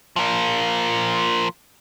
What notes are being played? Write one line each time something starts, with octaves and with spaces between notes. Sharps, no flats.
F3 A#3